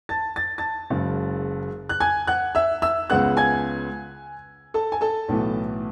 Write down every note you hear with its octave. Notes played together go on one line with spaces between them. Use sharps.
A5 A6
A6
A5 A6
F#1 F#2 C#3 G#3
F#6
G#5 G#6
F#5 F#6
E5 E6
E5 E6
C#2 C#3 G#3 B3 F#5 F#6
G#5 G#6
A4 A5
G#5
A4 A5
B1 A2 E3 B3